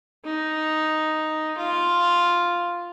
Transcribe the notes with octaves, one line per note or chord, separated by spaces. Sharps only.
D#4
F4